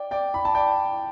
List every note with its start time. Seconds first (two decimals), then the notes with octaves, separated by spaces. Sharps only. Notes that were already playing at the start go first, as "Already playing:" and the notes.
Already playing: D5 G5
0.11 D5 G5
0.34 B5
0.45 A5
0.55 D5 G5